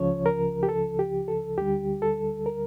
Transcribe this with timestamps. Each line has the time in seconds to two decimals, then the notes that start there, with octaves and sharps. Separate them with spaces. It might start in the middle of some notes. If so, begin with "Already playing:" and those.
Already playing: C#2 C#3 F3 C#5
0.26 A#4
0.63 G4
0.69 A4
0.99 G4
1.28 A4
1.58 D2 D3 G3 G4
2.02 A4
2.46 A#4